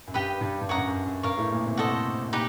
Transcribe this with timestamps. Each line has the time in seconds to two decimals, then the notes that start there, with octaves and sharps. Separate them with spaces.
0.08 F#2
0.14 G2 G4 B4 D#5 G5
0.41 G2
0.61 G2
0.69 F#2 C#5 F#5 A#5 D#6
0.78 G2
0.87 F#2
1.05 F#2
1.23 G2 A#4 C#5 F5
1.37 A2
1.50 A#2
1.65 C3
1.77 B2 F#4 A4 C5 D#5
2.33 A#2 D#4 G4 B4